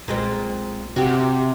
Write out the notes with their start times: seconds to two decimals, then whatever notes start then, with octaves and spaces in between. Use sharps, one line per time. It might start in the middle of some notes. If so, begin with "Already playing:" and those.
0.08 B1 A#2 G#3 C4
0.96 G1 C3 F#4 G4